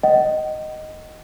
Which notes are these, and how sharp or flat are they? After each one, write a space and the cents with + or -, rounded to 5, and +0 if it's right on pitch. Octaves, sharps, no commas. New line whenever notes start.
D#5 +0 F#5 +40